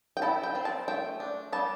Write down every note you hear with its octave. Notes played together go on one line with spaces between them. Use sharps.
G5
E4 A5
G5
C4
A5
A3 G5
D4
G3 A5